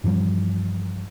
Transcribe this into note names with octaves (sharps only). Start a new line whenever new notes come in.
G2 E3 F3 G3